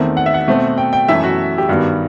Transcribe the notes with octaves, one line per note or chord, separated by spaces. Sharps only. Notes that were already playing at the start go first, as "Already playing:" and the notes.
Already playing: E2 D#3 A3 C4
F#5
E5
F#5
B2 A3 C4
G5
G5
F#2 E3 A3 E5
F#4
G4
G2 D#3 G3 B3 F#4